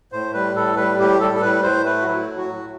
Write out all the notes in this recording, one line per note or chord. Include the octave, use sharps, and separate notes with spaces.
A2 C5
G3 B4
A2 A4
G3 B4
A2 G4
G3 A4
A4
A2 B4
A2 C5
A3 B4
F#4
F#3 E4
A2
F#4
A2